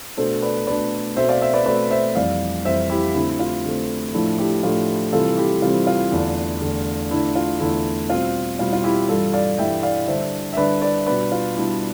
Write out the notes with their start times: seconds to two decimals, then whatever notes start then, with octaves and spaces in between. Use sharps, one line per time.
0.17 B2 A3 D4 A4 C5
0.42 B4 D5
0.67 B2 A3 D4 B4 D5
1.16 B2 A3 C4 C5 E5
1.29 D5 F5
1.42 C5 E5
1.53 B4 D5
1.66 B2 A3 C4 B4 D5
1.91 C5 E5
2.15 F2 E3 G3 D5 F5
2.65 F2 E3 G3 C5 E5
2.90 E4 G4
3.14 D3 A3 C4 E4
3.30 E4
3.39 F4
3.64 D3 A3 C4
4.13 A2 F3 A3 D4 E4
4.38 E4 G4
4.63 A2 F3 A3 D4 F4
5.12 C3 E3 G3 C4 F4 A4
5.37 E4 G4
5.62 C3 E3 G3 C4 F4
5.87 F4
6.12 E2 D3 A3 D4
6.61 E2 D3 A3 D4
7.11 E2 D3 A3 D4 E4
7.35 F4
7.60 E2 D3 A3 D4 E4
8.10 B2 G3 C4 F4
8.59 B2 G3 C4 F4
8.73 F4
8.84 E4 G4
9.09 G2 E3 G3 F4 A4
9.34 D5 F5
9.58 G2 E3 G3 E5 G5
9.83 D5 F5
10.08 D3 G3 D4 C5 E5
10.53 E5
10.57 D3 G3 D4 B4 D5
10.82 B4 D5
11.07 B2 G3 D4 B4 D5
11.32 F4
11.56 B2 G3 D4 E4